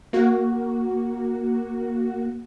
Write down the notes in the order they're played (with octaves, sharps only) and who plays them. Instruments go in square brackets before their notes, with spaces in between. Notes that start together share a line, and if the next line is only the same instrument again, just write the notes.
[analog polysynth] A#3 F#4